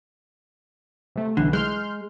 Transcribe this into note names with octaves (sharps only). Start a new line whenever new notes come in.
C3 A3
B1 D3 E3
G#3 C6 F6 G6